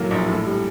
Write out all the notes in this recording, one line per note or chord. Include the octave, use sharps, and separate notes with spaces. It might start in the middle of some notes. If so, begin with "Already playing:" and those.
Already playing: F#2 A2 F#3 A#3
A#1
A2
G3